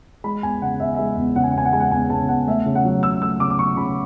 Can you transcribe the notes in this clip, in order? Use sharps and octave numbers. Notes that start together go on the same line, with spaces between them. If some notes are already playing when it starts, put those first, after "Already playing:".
G#3 B5
E2 G#5
C#3 F#5
E2 E5
G#3 E5
E2
C#3 F#5
G#5
F#5
E2 G#5
F#5
G#3 G#5
F#5
E2 G#5
C#3 A5
E2 F#5
A3 E5
C#3
F#5
F#3
C#3 E6
A3 E6
C#3 D6
D6
F#3 C#6
C#3 B5